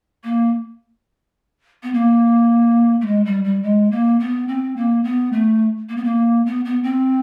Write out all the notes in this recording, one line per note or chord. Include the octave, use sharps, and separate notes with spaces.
A#3
B3
A#3
A3
G#3
G3
G3
G#3
A#3
B3
C4
A#3
B3
A3
A#3
B3
A#3
B3
B3
C4